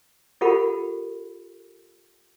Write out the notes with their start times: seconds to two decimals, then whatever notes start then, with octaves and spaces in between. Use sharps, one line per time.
0.41 F4 G4 A4 A#4 F#5 B5